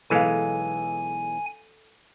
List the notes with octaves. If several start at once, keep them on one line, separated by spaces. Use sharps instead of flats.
B1 E3 G#3 A4 F5 G#5